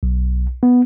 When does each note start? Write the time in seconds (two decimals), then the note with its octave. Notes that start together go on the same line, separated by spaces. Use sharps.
0.03 B1
0.63 B3